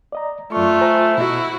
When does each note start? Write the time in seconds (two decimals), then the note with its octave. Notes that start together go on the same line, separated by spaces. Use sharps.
0.12 D5 D#5 A#5
0.52 F#2 A3 F4 D5 C#6
0.81 C5 G#5 A#5
1.17 B2 E4 F#4 D#5